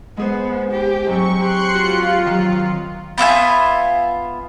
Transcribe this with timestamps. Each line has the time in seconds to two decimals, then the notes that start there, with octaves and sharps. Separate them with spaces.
0.17 G#3 B3 G#4 C5
0.71 G4
1.06 G#2 F#3 C4 C#6
1.38 G4 C6 F#6 C#7
1.75 F4 F#4
2.26 D#3 F#3
3.18 B3 F4 E5 G#5